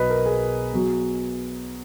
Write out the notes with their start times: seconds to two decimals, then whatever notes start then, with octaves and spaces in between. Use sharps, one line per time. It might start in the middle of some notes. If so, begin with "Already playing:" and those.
Already playing: B1 B2 F#3 B4 D#5
0.10 A#4
0.26 G#4
0.73 B2 F#3